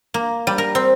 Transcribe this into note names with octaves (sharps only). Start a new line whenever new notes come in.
A#3
G3
A#4
C4